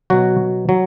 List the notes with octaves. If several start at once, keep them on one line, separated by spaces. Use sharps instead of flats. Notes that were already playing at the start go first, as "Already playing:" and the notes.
B2 F#3 F#4
F#3